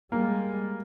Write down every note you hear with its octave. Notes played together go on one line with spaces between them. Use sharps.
G3 G#3 A#3